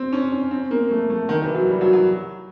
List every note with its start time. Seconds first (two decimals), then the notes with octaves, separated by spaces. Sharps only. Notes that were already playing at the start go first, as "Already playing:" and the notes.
Already playing: C4
0.12 C#4
0.32 C#4
0.51 C4
0.71 A#3
0.91 A3
1.10 A3
1.29 D#3
1.42 E3
1.54 F#3
1.68 G3
1.81 F#3
1.93 F#3